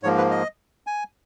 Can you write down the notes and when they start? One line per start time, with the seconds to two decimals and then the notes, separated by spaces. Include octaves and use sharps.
0.03 G#2 F3 A#3 C#5
0.18 B4
0.31 D#5
0.87 G#5